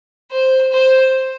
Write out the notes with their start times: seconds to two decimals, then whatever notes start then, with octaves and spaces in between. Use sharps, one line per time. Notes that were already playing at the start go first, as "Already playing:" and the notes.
0.32 C5
0.72 C5